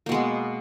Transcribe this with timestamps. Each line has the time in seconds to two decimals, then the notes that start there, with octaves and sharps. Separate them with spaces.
0.06 A#3
0.09 B2
0.12 G#3
0.14 B3